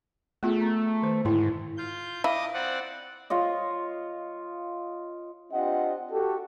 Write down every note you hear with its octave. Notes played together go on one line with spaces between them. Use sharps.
A3 B3 F4 G#4
A#5
D#3 C5
G#2 D3 E4
F4 G6
E4 D#5 F5 D6 D#6
C4 D5 F#5
F4 C#5 D#5
C4 D4 F4 G4 D#5 F#5
F#4 G4 A4